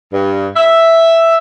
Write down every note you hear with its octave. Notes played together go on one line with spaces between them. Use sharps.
G2
E5